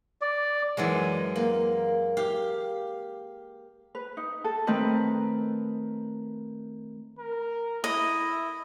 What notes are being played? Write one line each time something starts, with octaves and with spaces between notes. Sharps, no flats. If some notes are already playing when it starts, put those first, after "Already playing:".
D5
F#2 E3 F#3 G#3
A#3
G4 F5
B4
D#4
A4
D#3 A3 C4 B4 D#5
A#4
E4 D#5